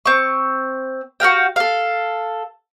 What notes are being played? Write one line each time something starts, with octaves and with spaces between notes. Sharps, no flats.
C4 C#6
F#4 A#4 F5 G5
A4 F5